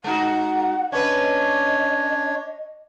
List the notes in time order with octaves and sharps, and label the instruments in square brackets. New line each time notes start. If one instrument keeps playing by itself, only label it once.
[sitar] G#3 D#4 F#4 [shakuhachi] F#5
[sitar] C#4 B4 [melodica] D4 C#5 [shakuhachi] D#5